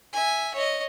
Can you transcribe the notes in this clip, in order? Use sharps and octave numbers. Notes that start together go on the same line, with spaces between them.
E5 G#5
C#5 D#5